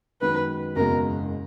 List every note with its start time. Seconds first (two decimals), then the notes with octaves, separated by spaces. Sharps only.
0.21 F#2 D#3 G#3 B3 D#4 B4
0.76 F#1 E2 B2 G#3 A#4